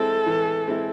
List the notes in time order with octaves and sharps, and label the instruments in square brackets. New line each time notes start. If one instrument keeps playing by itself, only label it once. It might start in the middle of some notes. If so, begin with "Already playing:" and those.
Already playing: [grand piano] G#3 C4 E4 [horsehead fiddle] A4
[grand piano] E3
G#3 C4 E4